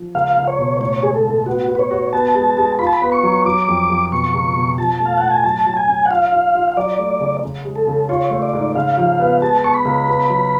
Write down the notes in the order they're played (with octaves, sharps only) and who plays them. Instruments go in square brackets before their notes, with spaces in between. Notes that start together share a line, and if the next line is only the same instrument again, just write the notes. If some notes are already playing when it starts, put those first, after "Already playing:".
Already playing: [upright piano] F3
[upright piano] C#2 [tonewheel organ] F5
[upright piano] C#2
[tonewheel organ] C#5
[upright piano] B2
[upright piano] A2 [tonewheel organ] C#5
[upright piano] G#3 [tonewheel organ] G#4
[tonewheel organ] A4
[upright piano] A2
[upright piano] B3 [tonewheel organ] F#4
[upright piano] B3
[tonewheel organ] B4
C#5
[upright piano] F#4
[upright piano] B3 [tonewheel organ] A5
[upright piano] G#3
G#3
[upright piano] F4 [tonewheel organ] B5
[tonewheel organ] A5
B5
[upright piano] B3
[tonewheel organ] C#6
[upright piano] F#3
[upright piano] F#3 [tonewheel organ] D6
[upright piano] F2
F2
[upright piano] B2 [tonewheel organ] C#6
[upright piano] C#2
B2
[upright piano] F3 [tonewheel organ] A5
[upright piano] A3
[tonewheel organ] F5
[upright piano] A2 [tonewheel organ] F#5
[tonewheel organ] G#5
[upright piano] F#3 [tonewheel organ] A5
[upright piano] F#3
[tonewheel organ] G#5
[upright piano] C#4
[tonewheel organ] F#5
[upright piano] F4 [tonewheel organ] F5
[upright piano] F4
F4
[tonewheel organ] F5
[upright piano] F#3 [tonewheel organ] D5
[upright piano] A3
C#3
C#3
G#3
[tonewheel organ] A4
[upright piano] C#3
[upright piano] F4 [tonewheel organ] C#5
[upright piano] A3
[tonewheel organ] D5
[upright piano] G#2
[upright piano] C#3 [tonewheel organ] F5
[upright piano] F3
B3
[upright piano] G#3 [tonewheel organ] A5
[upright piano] B3 [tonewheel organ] C#6
[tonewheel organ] B5
[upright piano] C#2
B3
F#3